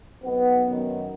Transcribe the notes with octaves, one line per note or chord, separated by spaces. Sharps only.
B1 B2 B3
F#2 D#3